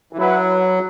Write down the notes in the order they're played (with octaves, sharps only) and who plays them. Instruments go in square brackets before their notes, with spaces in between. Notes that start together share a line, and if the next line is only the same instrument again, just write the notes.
[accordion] E3
[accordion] F#3 [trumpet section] E4 B4 F#5